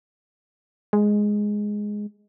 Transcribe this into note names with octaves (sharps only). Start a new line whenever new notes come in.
G#3